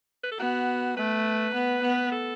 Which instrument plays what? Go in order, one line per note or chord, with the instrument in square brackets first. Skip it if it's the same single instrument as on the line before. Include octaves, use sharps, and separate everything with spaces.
[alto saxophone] B4
A4
[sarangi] B3 [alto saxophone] F#4
[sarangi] A3 [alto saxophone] B4
[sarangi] B3
B3
[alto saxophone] A4